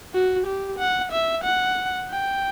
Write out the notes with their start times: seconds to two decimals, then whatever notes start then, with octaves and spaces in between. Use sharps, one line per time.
0.14 F#4
0.47 G4
0.79 F#5
1.12 E5
1.45 F#5
2.11 G5